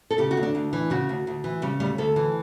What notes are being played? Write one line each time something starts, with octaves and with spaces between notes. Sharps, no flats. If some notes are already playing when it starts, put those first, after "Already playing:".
A4
C#3 G4
F#4
D2
D4
D2
E3
C#3 F#4
D2
D2
E3
C#3 G3
D2 G3
D2 A4
E3